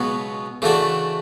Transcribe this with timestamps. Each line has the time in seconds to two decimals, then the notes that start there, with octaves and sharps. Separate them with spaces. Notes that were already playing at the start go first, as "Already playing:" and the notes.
Already playing: C#2 B2 F#3 B3
0.62 C#3 E3 A3 D4 F#4